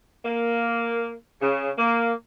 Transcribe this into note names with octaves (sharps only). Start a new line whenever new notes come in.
A#3
C#3
A#3